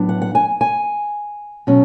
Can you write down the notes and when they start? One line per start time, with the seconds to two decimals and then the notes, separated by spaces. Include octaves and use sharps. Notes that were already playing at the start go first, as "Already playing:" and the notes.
Already playing: A2 F#3 B3 D4
0.09 F#5
0.22 F#5
0.35 G#5
0.61 G#5
1.67 B2 F#3 C#4